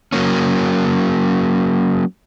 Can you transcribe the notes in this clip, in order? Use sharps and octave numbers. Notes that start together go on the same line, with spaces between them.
F#3 A#3 C#4